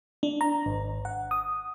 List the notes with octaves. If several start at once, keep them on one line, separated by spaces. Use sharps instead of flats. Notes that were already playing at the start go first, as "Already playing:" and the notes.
D4
A#5
G#1
F#5
D#6